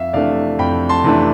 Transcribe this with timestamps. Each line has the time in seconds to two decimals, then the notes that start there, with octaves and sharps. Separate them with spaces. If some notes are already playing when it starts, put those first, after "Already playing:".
Already playing: F2 E5 F5
0.13 C3 E3 A3 D4 D5 F5
0.59 F2 G5 B5
0.89 A5 C6
1.04 C3 E3 A3 D4